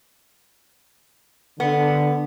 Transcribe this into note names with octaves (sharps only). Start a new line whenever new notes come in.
D3 B3